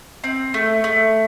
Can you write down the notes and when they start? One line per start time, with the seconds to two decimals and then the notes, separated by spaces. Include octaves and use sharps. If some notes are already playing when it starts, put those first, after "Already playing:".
0.24 C4
0.54 A3
0.84 A3